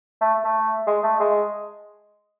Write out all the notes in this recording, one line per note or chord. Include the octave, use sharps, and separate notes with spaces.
A3
A3
G#3
A3
G#3